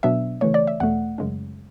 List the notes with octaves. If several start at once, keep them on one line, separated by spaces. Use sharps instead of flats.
B2 F#3 B3 D4 E5
C#3 E3 A3 C#5
D5
E5
E2 B2 A3 F#5
F#2 C#3 G#3 C#4